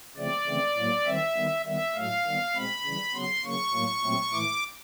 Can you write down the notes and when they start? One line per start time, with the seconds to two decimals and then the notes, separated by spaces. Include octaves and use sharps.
0.17 C#3 F3 A3 C4 D5
0.47 C#3 E3 A3 C4
0.76 A2 F#3 A#3
1.06 D#3 G3 C4 E5
1.36 D#3 G3 B3
1.65 D#3 G3 B3 E5
1.95 A2 F#3 A3 F5
2.25 D#3 G3 B3
2.55 B2 G#3 C4 B5
2.84 C#3 E3 G3
3.14 C#3 F#3 B3 C6
3.44 C#3 F#3 A#3 C#6
3.74 A2 F#3 A#3
4.03 A#2 F#3 A3 C4
4.33 A2 E3 A3 D6